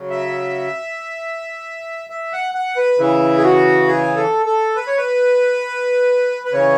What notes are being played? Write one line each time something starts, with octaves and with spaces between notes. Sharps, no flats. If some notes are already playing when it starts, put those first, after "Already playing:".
Already playing: C#3 F#3
E5
E5
F#5
F#5
B4
C#3 E3 E4
G#4
F#4
G#4
A4
A4
B4
C#5
B4
B4
C#3 E3 C#5